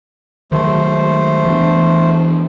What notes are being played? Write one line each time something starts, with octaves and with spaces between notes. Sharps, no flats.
D#3 F#3 G#3 A3 C5
E3 B3 D4